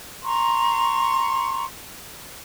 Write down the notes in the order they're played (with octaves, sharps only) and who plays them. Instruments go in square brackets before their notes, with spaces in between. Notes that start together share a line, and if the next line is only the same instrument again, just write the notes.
[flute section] A#5 C6 C#6